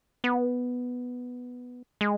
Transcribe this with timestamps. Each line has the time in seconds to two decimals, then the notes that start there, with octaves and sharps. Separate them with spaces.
0.24 B3
2.01 G#3